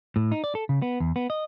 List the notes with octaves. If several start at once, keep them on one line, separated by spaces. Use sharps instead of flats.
A2
D#4
D5
A4
C#3
B3
E2
B3
D#5